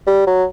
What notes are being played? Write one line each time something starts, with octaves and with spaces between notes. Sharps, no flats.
G3
F#3